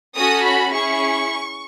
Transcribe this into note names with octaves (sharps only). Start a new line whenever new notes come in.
C#4 F#4 A4 D#6
B5
C#4 E4 G#4 C#6